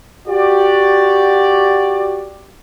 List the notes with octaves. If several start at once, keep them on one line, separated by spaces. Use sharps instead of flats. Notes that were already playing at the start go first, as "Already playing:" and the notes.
F#4 G4 D5